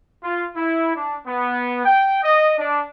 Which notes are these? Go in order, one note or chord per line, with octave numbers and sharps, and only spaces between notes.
F4
E4
D4
B3
G5
D#5
D4